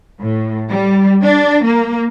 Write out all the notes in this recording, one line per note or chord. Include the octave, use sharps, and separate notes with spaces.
A2
G3
D4
A#3